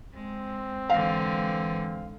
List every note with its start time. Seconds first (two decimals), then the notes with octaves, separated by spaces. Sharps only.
0.13 G#3 C4
0.90 G#2 D3 E3 F5